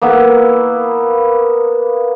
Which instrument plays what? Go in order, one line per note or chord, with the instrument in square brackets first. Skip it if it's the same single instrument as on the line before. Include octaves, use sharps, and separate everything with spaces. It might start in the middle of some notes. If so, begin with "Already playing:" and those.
[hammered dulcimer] A#3 B3 E4